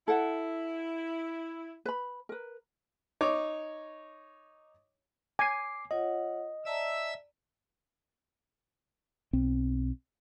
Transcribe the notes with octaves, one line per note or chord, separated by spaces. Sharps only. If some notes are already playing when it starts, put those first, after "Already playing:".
E4 A4 F#5
B4 B5
A#4 B4
D#4 C#5 D6
G#5 D6 C7
F4 C#5 D#5 F#5
D5 E5 A5 A#5 E6
B1 C4